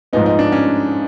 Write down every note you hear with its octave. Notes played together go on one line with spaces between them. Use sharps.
G#2 F3 G#3 B3 D#4
D#4
D4
C#4